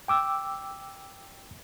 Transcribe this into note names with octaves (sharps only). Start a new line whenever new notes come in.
G5 D6 E6